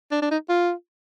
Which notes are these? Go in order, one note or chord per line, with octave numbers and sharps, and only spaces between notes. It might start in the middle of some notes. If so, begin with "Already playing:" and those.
D4
D4
D#4
F4